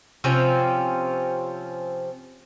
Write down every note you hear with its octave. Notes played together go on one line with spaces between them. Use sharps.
C3 F3 C4 C#4